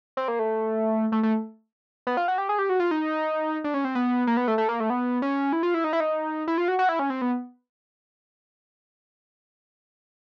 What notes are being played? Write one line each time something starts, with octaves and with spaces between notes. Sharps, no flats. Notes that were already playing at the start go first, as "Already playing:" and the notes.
C4
A#3
A3
A3
A3
B3
F4
F#4
G4
G#4
G4
F#4
F4
D#4
D4
C#4
C4
B3
A#3
B3
A3
A3
A#3
A3
B3
C#4
E4
F4
E4
D#4
E4
D#4
E4
F4
F#4
F#4
E4
C#4
C4
B3